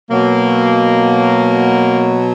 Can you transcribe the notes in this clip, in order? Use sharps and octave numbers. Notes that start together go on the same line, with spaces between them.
B2 F#3 A#3